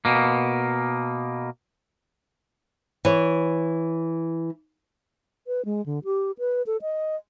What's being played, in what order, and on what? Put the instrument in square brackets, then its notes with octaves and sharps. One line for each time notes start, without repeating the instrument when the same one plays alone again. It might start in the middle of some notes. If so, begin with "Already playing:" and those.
[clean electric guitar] B2 A#3
[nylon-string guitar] E3 C#5
[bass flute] B4
G#3
D3
G4
B4
A4
D#5